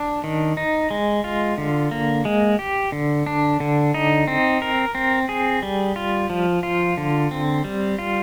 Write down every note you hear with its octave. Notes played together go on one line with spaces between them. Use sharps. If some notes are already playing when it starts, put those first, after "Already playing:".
Already playing: D4
D#3
D#4
G#3
F4
D3
A#3
G#3
G4
D3
D4
D3
D#4
C4
A#4
C4
G#4
G3
F4
F3
F4
D3
C4
G3
F4